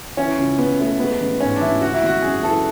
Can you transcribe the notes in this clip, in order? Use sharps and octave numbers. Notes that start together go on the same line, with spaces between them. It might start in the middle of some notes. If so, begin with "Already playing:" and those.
E3 C#4
C#2
C#3 B3
A3 B3
G#3 B3
A1
G#2 C#4
D4
A1 E4
C#3 F#4
E4
G#1 F#4
F#2 G#4
E3 A4